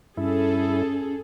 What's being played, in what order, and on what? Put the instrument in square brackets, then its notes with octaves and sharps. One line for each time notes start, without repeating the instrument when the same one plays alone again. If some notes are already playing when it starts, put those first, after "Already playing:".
[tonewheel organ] G2 E4 [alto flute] C#4 [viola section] G#4 A4